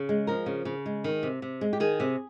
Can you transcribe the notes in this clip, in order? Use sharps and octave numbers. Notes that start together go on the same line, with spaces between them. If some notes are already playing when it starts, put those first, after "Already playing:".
Already playing: C#3
G#3
F3 A#4
C#3
C#3
G#3
D#3
C3
C3
G#3
G4
D#3 G#4
C3